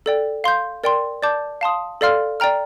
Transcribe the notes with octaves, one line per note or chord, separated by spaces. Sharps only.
A4 D5 G5
F5 C6 G6
A#4 D5 G5 C6
D5 A5 D6 G6
F5 A5 C6 D#6
A4 D5 F5 C6 F6
D5 G5 A#5 F6